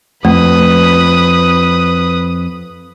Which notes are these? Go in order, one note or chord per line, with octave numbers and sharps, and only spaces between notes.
F2 A3 B4 D#6